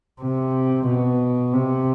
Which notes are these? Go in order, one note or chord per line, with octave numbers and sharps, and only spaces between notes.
C3
B2
C3